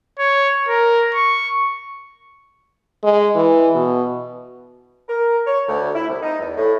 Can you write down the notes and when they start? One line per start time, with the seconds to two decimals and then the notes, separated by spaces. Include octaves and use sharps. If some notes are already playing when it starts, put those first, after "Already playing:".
0.19 C#5
0.69 A#4
1.15 C#6
3.04 G#3
3.35 E3
3.75 B2
5.08 A#4
5.47 C#5
5.68 D2
5.95 E4
6.08 C2
6.22 D#4
6.40 E2
6.56 A2